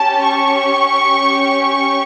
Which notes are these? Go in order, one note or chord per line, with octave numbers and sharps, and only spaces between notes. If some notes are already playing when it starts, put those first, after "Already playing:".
Already playing: C#4 G4 A5
C#6